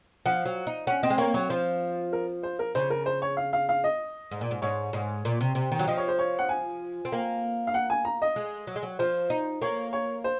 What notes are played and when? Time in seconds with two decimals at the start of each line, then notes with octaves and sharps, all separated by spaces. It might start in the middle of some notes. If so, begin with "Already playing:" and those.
0.26 F3 F#5
0.45 F#3
0.67 D#4
0.87 C#4 F#5
1.03 C4 D#5
1.10 G#3
1.18 A#3 C#5
1.34 F#3 C#5
1.49 F3 C5
2.13 A#4
2.43 C5
2.59 A#4
2.75 C#3 C5
2.90 A#4
3.06 C5
3.22 C#5
3.37 F5
3.53 F5
3.69 F5
3.84 D#5
4.31 G#2
4.41 A#2
4.51 G#2
4.62 G#2 C#5
4.93 G#2
5.25 A#2
5.41 C3
5.55 C3
5.72 D#3
5.79 F#3
5.88 F3 D#5
5.97 C#5
6.08 C5
6.19 C#5
6.39 F#5
6.49 G#5
7.05 C4
7.12 A#3
7.67 F5
7.74 F#5
7.90 G#5
8.05 A#5
8.22 D#5
8.36 G#3
8.67 F#3
8.76 G#3
8.83 F#3
8.99 F3 C5
9.30 D#4
9.62 A#3 C#5
9.93 C#5
10.24 C5